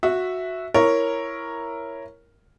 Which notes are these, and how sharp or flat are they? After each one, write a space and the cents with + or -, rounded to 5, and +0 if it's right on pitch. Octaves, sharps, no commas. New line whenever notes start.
F#4 -10 E5 +0
E4 +10 A#4 +0 C#5 +0